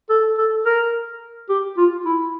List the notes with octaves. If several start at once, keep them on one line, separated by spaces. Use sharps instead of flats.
A4
A4
A#4
G4
F4
E4